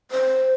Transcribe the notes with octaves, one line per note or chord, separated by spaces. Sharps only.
C5